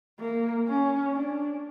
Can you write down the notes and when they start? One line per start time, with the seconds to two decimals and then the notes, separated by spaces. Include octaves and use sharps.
0.20 A#3
0.68 C#4
1.13 D4